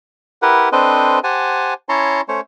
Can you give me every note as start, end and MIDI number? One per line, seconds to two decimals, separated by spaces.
0.42 0.69 64
0.42 0.69 67
0.42 0.69 70
0.42 0.69 71
0.42 0.69 78
0.72 1.19 60
0.72 1.19 62
0.72 1.19 69
0.72 1.19 71
0.72 1.19 72
0.72 1.19 75
1.24 1.74 67
1.24 1.74 72
1.24 1.74 78
1.24 1.74 80
1.24 1.74 81
1.89 2.21 61
1.89 2.21 64
1.89 2.21 73
1.89 2.21 81
1.89 2.21 82
1.89 2.21 84
2.28 2.41 57
2.28 2.41 61
2.28 2.41 72
2.28 2.41 73